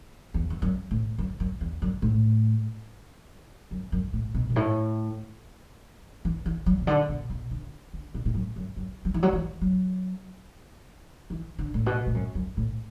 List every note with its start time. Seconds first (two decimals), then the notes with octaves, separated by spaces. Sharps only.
0.34 E2
0.50 E2
0.62 F#2
0.91 A2
1.18 F#2
1.40 F#2
1.61 E2
1.82 F#2
2.02 A2
3.71 F#2
3.92 F#2
4.13 A2
4.34 B2
4.50 F#2
4.56 A2
6.25 E3
6.46 E3
6.66 F#3
6.81 B2
6.87 D3
7.09 B2
7.30 B2
7.51 D3
7.93 D3
8.14 B2
8.25 A2
8.34 F#2
8.56 F#2
8.77 F#2
9.05 F#3
9.14 E3
9.23 F#3
9.33 E3
9.61 F#3
11.30 E3
11.59 D3
11.74 A2
11.86 B2
12.06 A2
12.14 F#2
12.35 F#2
12.57 A2